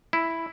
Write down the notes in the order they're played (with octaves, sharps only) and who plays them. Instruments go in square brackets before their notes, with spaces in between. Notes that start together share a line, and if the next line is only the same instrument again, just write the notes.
[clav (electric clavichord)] E4